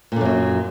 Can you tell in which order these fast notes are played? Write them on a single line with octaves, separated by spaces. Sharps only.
A#2 D3 F#2 F#3